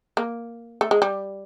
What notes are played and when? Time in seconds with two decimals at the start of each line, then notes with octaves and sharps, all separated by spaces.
0.17 A#3
0.81 A3
0.91 G#3
1.02 G3